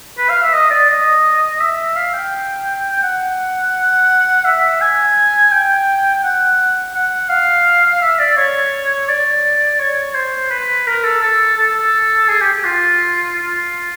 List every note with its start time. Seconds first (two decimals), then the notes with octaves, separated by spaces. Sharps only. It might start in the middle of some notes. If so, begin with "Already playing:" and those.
0.18 B4
0.29 F5
0.42 E5
0.53 D#5
0.70 D5
0.89 D#5
1.60 E5
1.95 F5
2.14 G5
2.92 G5
3.03 F#5
4.45 E5
4.81 G#5
5.52 G5
6.23 F#5
6.95 F#5
7.29 F5
8.01 E5
8.19 D5
8.37 C#5
9.08 D5
9.79 C#5
10.15 C5
10.51 B4
10.87 A#4
11.04 A4
11.22 A4
11.57 A4
12.29 G#4
12.40 G4
12.53 G4
12.65 F4
13.36 F4